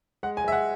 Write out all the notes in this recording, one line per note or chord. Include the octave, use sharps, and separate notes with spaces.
G#3 F#5
G#5
G#3 E5
F#5